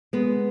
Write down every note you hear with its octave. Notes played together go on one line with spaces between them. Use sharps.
G#3 B3